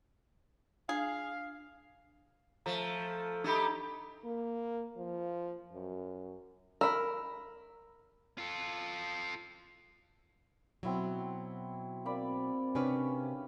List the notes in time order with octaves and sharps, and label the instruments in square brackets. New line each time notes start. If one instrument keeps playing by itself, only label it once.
[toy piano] D4 F4 D5 [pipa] G#4 [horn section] F5
[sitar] F3 A3 [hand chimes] A#5
[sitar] A3 D#4 G4 [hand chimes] D4 B5
[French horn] A#3
F3
F#2
[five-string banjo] A#4 [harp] B5 E6
[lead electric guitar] F4 A4
[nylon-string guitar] B2 F#3 [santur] C4 E4 F#4
[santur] A#3 D5 B5 [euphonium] C4
[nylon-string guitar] C3 D4 B4 [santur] C#4 G4